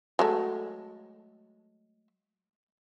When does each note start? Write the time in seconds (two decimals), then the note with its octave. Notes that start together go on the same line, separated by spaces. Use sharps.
0.19 F#3 G#3 A3